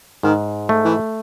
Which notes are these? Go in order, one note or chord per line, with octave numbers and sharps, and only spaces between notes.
G#2 D#3
A3
E3